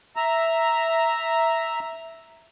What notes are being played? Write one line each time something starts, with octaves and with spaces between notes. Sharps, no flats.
E5 A#5